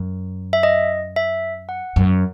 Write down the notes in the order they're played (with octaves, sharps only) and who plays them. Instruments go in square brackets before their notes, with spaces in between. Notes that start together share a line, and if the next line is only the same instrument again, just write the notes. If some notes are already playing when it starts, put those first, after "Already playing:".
Already playing: [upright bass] F#2
[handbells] E5
D#5
E5
F#5
[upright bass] F#2